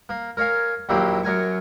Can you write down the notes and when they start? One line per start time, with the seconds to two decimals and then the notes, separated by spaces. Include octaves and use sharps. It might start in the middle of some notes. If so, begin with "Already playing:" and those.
0.09 A#3
0.37 A#4 C#5 F5 G#5
0.89 A#1 D#2 F#3 A#3 E4 G4
1.23 F#2 A#4 G#5 C#6